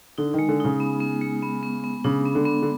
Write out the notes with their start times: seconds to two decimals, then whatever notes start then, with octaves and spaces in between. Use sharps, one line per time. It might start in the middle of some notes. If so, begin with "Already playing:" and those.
0.18 D3 D#4
0.34 D#3 G#3
0.49 D3
0.60 C#3 D#4
0.80 B3
1.00 B3
1.21 G#3
1.42 B3
1.63 B3
1.84 B3
2.04 C#3 D4
2.25 B3
2.35 D3
2.45 B3
2.62 D3